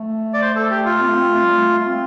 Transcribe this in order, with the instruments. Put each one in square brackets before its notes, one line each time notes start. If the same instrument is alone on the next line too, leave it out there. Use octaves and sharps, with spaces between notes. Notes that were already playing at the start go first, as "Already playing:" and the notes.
Already playing: [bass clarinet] A3
[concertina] D5
C5
A4
G4
F4
[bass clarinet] C4
A3
C4
A3
G3
A3
A3
C4